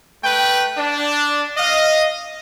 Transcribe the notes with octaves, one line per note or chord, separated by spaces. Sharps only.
A3 B4 G5
D4
D#5 F5